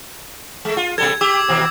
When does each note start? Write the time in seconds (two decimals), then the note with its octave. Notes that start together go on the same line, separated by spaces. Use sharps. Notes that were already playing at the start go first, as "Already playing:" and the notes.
0.65 G#3 A3
0.77 F4
0.98 B2 G3 A4 G#6
1.21 G4 D6 E6
1.49 D#2 B2 C4